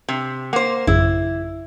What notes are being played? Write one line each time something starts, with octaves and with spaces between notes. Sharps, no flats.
C3
A#3 C5 F#5
A1 F#2 C#3 E4